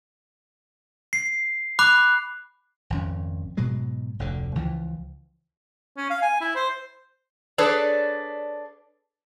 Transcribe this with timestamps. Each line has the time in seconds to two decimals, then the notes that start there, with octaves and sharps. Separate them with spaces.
1.13 C7
1.79 B5 D6 F#6
2.90 G#1 F2 C#4
3.57 G#2 B2 F#3 G#3
4.19 F1 D2 D3
4.55 C#2 E3 F3
5.97 C#4
6.10 F5
6.22 G#5
6.41 E4
6.55 C5
7.58 D4 G#4 A4 B4 C#5 D5